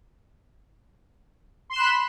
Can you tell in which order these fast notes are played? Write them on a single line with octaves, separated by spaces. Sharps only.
C6 E7 F#6 B5